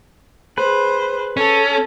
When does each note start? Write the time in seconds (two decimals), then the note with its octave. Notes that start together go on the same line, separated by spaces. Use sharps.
0.58 G#4 B4 C5
1.37 C#4 A4